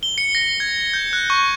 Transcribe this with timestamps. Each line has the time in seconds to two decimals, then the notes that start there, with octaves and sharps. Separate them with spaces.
0.03 G7
0.18 C#7
0.35 A#6
0.60 G#6
0.93 G6
1.13 F#6
1.30 C#6